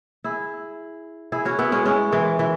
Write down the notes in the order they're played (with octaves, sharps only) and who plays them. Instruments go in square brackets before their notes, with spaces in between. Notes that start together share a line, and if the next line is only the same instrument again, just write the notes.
[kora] E4 G#4
E4 G#4
C#4 F#4
B3 E4
G#3 C#4
G#3 C#4
E3 G#3
E3